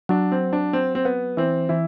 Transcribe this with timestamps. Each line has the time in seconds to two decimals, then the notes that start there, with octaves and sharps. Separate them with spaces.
0.09 F#3 D4
0.32 C4
0.53 D4
0.73 C4
0.95 C4
1.05 B3
1.37 E3 C4
1.69 E3 E4